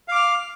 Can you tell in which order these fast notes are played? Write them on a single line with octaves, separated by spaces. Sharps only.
F5 D6 F6